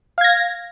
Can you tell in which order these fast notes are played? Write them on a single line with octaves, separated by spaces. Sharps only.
F5 G#6 A#6